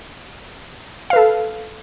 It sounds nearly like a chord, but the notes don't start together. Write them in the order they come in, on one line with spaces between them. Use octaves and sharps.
F5 B4 A4